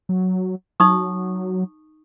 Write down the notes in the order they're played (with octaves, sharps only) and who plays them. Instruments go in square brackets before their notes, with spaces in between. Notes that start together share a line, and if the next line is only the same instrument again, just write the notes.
[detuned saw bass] F#3
[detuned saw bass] F#3 [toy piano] D#4 C#6 D#6